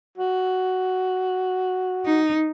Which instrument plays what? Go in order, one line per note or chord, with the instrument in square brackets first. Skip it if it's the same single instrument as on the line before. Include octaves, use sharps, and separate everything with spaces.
[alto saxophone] F#4
[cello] D#4